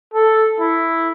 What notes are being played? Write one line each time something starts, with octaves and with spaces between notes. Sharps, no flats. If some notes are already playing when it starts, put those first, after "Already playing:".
A4
E4